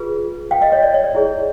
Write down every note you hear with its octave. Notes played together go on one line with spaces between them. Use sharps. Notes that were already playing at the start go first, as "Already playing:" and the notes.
Already playing: F4 G#4 B4
F5 G5
D#5 F5
C#5 D#5
D5
C#5
D5
E4 G#4 C#5